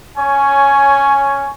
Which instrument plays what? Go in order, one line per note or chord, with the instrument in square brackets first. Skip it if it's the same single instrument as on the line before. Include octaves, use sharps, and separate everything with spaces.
[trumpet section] C#4 C#5 G#5